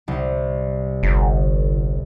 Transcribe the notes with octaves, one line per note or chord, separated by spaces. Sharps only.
C2
G1